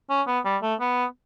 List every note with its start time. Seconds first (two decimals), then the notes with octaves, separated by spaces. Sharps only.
0.10 C#4
0.27 B3
0.45 G3
0.62 A3
0.80 B3